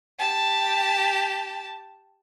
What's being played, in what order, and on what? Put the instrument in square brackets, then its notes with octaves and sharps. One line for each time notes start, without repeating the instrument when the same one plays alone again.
[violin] G4 A5